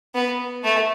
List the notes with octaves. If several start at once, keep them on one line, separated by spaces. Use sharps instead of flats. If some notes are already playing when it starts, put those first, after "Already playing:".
B3
A3